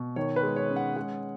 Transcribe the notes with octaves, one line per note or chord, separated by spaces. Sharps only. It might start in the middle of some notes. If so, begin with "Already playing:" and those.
Already playing: B2
D#3 C#5
B4
G#3
C#5
C#4
F#5
G#3 F#5